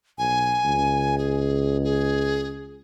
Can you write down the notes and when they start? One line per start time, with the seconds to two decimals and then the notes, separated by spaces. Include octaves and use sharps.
0.18 B1 G#5
0.64 C#2
1.18 G#4
1.83 G#4